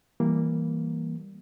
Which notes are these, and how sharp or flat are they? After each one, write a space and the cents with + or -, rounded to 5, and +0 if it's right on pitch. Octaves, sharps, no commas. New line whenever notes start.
E3 +0 G3 +0 A#3 +0